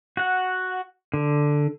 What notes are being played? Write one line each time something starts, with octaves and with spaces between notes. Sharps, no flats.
F#4 F#5
D3